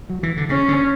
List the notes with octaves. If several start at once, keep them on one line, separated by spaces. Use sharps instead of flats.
F#3
E3
D3
C#3 C#4
D3